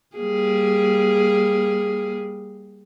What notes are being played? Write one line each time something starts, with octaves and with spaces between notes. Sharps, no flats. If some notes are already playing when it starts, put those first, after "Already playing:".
G3 A#3 G#4